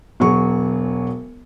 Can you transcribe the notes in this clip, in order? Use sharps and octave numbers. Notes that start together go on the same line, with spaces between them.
E1 F#3 G#4 C#6